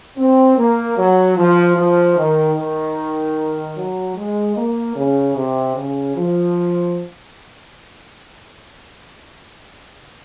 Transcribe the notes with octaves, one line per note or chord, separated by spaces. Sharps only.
C4
A#3
F#3
F3
F3
D#3
D#3
F#3
G#3
A#3
C#3
C3
C#3
F3